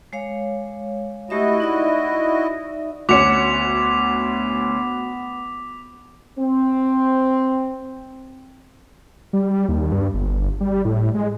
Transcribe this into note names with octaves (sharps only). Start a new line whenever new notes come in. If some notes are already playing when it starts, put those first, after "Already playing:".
G#3 C#5 F5
A3 E4 F#4 G4 D#5 E5
D#4 D5 E5
D2 B3 C#4 F#4 D6 B6 C#7 F7
C4
G3
D#2
G2
G1
G3
A2
G#3